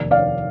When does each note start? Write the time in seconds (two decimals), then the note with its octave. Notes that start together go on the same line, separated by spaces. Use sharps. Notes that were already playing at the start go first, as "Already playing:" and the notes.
Already playing: F1 D#2 D#3 D5
0.11 D5 F5